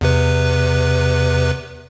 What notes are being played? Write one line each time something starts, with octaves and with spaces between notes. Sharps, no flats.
E2 C3 B4